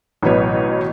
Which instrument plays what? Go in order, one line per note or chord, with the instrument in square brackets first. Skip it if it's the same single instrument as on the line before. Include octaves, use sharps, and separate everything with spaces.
[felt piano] A1 B2 F#3 B3 B4 C#5